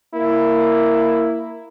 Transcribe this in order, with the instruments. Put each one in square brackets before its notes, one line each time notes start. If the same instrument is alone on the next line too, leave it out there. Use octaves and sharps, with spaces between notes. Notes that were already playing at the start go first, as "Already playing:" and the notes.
[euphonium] A#3 [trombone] E4